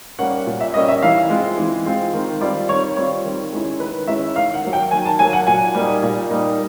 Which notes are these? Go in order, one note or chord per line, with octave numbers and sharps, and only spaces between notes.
G3 A#3 C#4 F#5
A#2
E5
G3 A#3 C#4 D#5
E5
E3 F5
G#3 C4 F4
E3
G#3 C4 F4
D#3
G3 C4 F4 D5
D#3 C#5
G3 C4 F4 C#5
D#3
G#3 C#4 E4
D#3 B4
G#3 C#4 E4 E5
D#3 F5
F#5
F#3 A#3
G5
D#3 G#5
A5
F#3 A#3 G#5
F#5
A#2 G#5
G3 A#3 D#4
A#2
G3 A#3 D#4